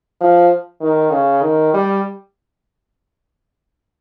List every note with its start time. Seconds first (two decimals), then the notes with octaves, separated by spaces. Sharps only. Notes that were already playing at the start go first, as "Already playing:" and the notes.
0.21 F3
0.81 D#3
1.11 C#3
1.42 D#3
1.74 G3